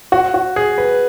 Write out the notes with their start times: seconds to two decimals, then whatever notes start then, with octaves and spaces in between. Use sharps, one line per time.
0.12 F#4
0.34 F#4
0.56 G#4
0.78 B4